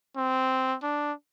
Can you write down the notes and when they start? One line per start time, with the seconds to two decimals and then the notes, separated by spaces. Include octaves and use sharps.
0.16 C4
0.83 D4